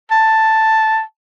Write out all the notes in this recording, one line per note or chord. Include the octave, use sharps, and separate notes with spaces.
A5